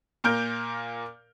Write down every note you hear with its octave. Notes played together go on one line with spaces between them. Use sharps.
A#2 A#3 A#4 F6 G6 D7